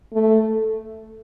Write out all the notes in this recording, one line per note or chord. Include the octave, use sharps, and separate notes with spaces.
A3